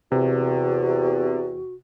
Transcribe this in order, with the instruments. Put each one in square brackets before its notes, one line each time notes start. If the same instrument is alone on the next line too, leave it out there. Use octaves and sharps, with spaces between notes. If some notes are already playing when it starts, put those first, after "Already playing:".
[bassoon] E2 [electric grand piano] C3 [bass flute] F#4